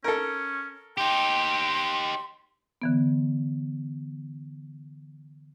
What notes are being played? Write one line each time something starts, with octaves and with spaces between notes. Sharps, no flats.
C#4 A4 A#4
D#4 G4 G5 C6
D3 E3 B3